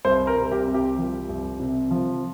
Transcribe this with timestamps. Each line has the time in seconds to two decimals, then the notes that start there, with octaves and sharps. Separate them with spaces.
0.05 C2 C5
0.27 A#4
0.36 C3
0.52 G4
0.67 C2
0.74 G4
0.98 F3
1.29 C2
1.60 C3
1.91 F3